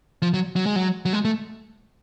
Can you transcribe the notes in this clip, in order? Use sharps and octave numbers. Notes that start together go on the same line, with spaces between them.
F3
F#3
F#3
G#3
F#3
F#3
G#3
A3